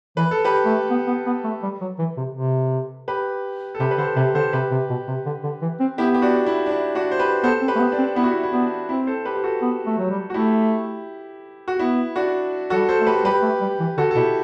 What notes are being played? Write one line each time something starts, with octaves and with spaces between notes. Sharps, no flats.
E3 B4
A4
G4 B4
A3
B3
B3
B3
A3
G3
F#3
E3
C3
C3
G4 B4
A4
C3 G4 B4
B4
D3 A4 C5
C3 G4 B4
D3 A4 C5
C3 G4 B4
C3
B2
C3
D3
D3
E3
C4
B3 E4 G4
G4
D4 F#4
E4
D4
E4
D4 F#4
C5
G4 B4
B3 A4 C5
C4
G4 B4
A3
B3
D4
C4
B3 E4
F#4
E4
E4
B3 D4
C4 E4
A4 C5
G4 B4
G4
F#4 A4
B3
A3
F#3
G3
F#4
A3 E4 G4
F#4
B3 E4
D4 F#4
F#3 F#4 A4
G3
A4 C5
A3
G4 B4
G3 G4 B4
A3
G3
E3
D3 F#4 A4
A4
B2 E4 G4